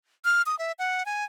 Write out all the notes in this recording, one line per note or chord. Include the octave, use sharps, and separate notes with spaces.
F6
D#6
E5
F#5
G#5